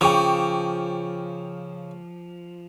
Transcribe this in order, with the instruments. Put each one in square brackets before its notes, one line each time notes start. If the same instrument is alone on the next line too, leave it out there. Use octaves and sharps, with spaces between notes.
[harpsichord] C#3 [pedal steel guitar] F3 [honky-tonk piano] G5 C#6 D6